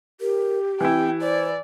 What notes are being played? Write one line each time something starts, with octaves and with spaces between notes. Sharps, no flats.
G4 A#4
E3 C4 E4 G5
C5 D5